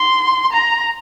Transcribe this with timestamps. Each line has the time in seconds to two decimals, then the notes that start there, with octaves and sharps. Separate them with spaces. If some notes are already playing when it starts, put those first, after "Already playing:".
Already playing: C6
0.52 A#5